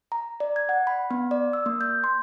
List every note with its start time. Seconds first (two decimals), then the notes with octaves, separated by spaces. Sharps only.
0.12 A#5
0.40 D5
0.56 G#6
0.69 F#5
0.87 B5
1.11 B3
1.31 D5
1.53 E6
1.66 A#3
1.81 G6
2.04 C6